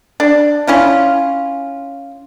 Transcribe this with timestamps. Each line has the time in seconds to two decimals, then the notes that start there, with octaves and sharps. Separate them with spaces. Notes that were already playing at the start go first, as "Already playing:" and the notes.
0.20 D4
0.67 C#4 E4 F4